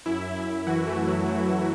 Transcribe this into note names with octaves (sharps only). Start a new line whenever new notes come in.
F#2 E4
F#2 E4
E3 F#4
A3
E3
F#3
F#2 A3